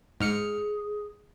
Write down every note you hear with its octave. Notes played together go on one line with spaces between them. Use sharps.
G#2 G#4 F6 C#7